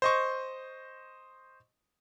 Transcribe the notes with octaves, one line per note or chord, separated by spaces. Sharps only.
C5 D#5 C#6